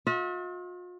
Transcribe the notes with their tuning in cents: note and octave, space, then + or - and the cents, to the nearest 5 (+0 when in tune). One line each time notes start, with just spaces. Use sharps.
F4 +45 E5 -40